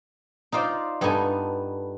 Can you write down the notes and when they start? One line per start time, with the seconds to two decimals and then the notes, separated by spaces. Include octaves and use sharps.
0.52 D#4 F4 C5 D5
1.01 G2 B3 D#4 A4 G#5